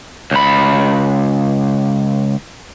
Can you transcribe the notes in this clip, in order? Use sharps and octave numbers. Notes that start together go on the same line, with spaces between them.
C#2 B5